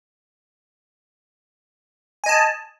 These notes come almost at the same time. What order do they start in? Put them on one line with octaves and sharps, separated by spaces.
G#5 D#5 A5